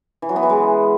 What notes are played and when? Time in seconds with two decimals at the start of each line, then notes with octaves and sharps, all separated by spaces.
0.22 E3
0.29 F#3
0.36 B3
0.43 E3
0.50 G#3